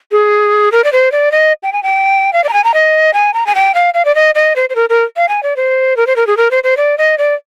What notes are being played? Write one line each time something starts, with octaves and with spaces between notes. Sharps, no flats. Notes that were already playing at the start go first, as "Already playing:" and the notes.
G#4
A#4
D5
C5
D5
D#5
G5
G#5
G5
F5
D5
A#5
G#5
A#5
D#5
G#5
A#5
G#5
G5
F5
F5
D5
D#5
D#5
C5
C5
A#4
A#4
F5
G#5
D5
C5
A#4
C5
A#4
G#4
A#4
C5
C5
D5
D#5
D5